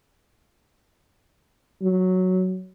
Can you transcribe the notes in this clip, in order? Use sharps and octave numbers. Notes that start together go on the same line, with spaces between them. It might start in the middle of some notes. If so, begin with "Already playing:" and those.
F#3